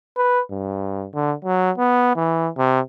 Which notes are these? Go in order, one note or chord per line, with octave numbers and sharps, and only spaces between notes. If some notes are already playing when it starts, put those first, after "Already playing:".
B4
G2
D3
F#3
B3
E3
C3